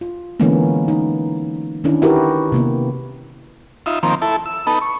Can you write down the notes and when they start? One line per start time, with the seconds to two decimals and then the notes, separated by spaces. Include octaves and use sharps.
0.01 F4
0.40 D3 E3 G#3 A#3 B3 C#4
0.88 D#4
1.84 D#3 C#4 D4 E4
2.02 E4 F#4 G4 A#4 B4
2.52 C3 A#3 B3
3.86 D#4 F4 E5
4.03 D#3 F3 A#3 C4
4.22 E4 A4
4.46 E6
4.67 B3 D#4 A4
4.81 C#6